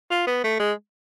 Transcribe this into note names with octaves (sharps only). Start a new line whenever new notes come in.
F4
B3
A3
G#3